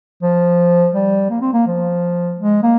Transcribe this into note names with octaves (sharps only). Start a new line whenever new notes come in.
F3
G3
A#3
C4
A#3
F3
G#3
A#3